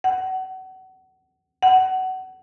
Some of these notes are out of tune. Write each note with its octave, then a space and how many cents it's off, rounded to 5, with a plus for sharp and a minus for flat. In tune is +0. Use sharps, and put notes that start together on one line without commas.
F#5 +30
F#5 +25